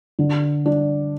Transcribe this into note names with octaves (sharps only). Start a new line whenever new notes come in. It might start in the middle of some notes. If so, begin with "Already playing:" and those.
D3
D4